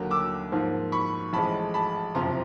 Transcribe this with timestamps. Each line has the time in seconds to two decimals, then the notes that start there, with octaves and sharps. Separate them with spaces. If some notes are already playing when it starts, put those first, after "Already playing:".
Already playing: D#2 D3 F#3 A#3
0.11 D6 E6
0.52 G#2 F3 A#3
0.92 B5 C#6
1.33 A1 A2 F3 G#3 A5 B5
1.74 A5 B5
2.15 F#1 F2 C3 F3 A#5 C6